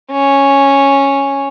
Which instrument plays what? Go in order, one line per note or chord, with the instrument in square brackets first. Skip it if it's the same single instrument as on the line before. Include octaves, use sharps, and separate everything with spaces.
[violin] C#4